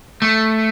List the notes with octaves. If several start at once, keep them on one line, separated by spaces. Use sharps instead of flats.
A3